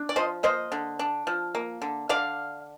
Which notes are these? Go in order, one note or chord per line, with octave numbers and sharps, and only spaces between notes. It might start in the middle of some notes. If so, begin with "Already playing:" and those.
Already playing: D4
D5
F3 C5 D#5
A#3 C5 D#5
D3
D4
F3
A#3
D3
D3 D5 F5